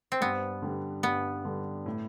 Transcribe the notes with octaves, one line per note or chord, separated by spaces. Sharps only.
C4
G2 B3
D3 G3
G2 B3
D3 G3
A2